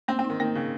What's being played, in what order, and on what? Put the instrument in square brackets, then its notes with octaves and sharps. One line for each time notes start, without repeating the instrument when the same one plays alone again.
[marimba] A#3 [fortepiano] C4
[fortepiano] C4
[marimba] D#4
[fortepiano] D#3
[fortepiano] D#3 [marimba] A#3
[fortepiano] C#3